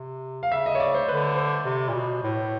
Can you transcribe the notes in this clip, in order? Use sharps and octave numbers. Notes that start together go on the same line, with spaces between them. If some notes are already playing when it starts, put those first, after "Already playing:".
Already playing: C3
F5
C#3 E5
D#5
C#5
D5
C5
D3 B4
C5
C3
A#2
B2
A2